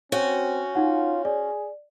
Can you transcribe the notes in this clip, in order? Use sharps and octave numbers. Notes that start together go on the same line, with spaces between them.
C4 C#4 F#4 C#5
D#4 F4 F#5
G#4 D5